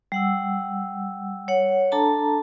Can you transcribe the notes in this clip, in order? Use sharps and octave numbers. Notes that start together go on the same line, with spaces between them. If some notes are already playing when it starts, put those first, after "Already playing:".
G3 F#5 E6
C#5 F#5
D4 A4 A5 A#5